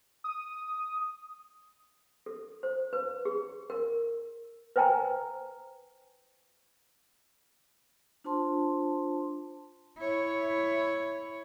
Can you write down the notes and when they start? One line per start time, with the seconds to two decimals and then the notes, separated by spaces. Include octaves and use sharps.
0.24 D#6
2.26 A4
2.63 C5
2.93 B4
3.25 G#4
3.70 A#4
4.76 B4 C5 G5 G#5 A#5
8.24 D4 F4 C5 A5 C6
9.97 E4 C#5